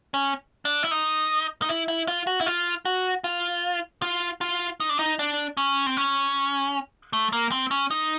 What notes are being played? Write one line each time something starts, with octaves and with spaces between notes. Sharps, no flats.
C#4
D4
E4
D#4
D#4
E4
E4
F4
F#4
E4
F4
F#4
F4
F4
F4
D#4
D4
D#4
D4
C#4
C4
C#4
A3
A#3
C4
C#4
D#4